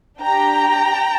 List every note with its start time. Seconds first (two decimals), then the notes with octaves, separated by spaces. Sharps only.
0.20 D4 G4 G5 A#5